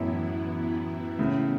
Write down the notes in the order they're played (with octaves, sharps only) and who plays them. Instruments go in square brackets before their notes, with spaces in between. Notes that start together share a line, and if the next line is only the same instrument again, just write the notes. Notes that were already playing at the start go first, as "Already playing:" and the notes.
Already playing: [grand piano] F#2 A2 [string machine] E3 B3 E4
[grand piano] A2 C#3